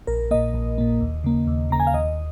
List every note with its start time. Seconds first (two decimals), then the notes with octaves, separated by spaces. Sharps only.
0.07 A#1 A#4
0.31 A#2 A#3 D#5
0.54 A#1
0.78 A#2 A#3
1.01 D#2
1.24 C#3 A#3
1.47 D#2
1.70 C#3 A#3 A#5
1.80 G#5
1.87 F5
1.94 D#2 D#5